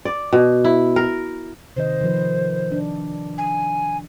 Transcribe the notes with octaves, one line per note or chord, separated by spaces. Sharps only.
D5
B2
E4
A#4
C3 D#3 C5 D#5
D#3 F3 B4
D4
G#5